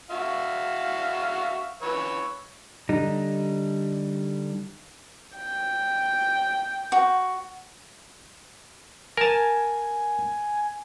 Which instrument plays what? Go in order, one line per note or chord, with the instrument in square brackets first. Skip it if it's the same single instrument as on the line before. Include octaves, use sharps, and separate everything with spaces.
[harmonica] F#4 E5 F5
B4 C#5 E6
[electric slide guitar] D3 G3 D#4
[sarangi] G5
[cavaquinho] F#4
[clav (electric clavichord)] A#4 A5 [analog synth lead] G#5